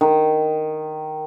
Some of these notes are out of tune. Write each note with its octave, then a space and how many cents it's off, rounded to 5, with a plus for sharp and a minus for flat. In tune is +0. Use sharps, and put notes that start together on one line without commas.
D#3 -5